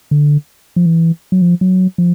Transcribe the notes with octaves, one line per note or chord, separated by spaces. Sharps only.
D3
F3
E3
F#3
F3
F#3
F3